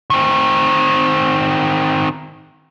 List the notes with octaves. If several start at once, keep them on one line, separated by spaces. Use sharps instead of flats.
D#3 C4